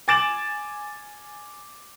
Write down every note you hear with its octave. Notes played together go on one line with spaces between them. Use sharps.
G#5 D6 A6 D7 E7 F#7